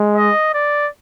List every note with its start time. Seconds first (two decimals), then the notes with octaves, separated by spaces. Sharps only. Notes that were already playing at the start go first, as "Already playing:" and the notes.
Already playing: G#3
0.16 D#5
0.54 D5